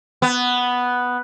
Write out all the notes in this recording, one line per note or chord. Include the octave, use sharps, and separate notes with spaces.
B3